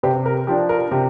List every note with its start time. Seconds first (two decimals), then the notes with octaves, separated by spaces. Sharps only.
0.03 C3 G4 C5
0.26 A#4
0.47 F3 D4 G4
0.69 A#4
0.91 C3 G4